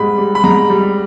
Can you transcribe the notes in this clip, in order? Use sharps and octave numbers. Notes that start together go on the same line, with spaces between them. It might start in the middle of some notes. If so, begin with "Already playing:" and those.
Already playing: G#2 G3 B5
G3
B5
G#2 A#5
G3